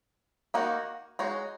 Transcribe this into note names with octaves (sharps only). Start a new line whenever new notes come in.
D#3 A#3 D#4 F#4
G#3 D#4 F#4 C#5